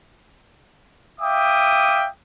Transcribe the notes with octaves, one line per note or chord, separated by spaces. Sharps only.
E5 F5 G5 D6 D#6